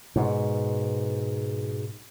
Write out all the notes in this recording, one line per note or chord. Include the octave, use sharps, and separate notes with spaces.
G#2 B2